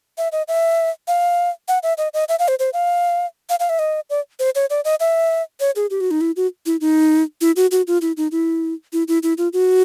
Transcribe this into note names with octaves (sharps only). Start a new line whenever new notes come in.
E5
D#5
E5
F5
F#5
E5
D#5
D#5
E5
F5
C5
C5
F5
F5
F5
E5
D#5
D5
C5
C#5
D5
D#5
E5
C#5
G#4
G4
F#4
D#4
E4
F#4
E4
D#4
E4
F#4
F#4
F4
E4
D#4
E4
E4
E4
E4
F4
F#4